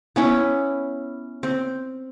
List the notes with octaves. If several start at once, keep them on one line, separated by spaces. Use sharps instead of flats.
B3 C#4 E4
C4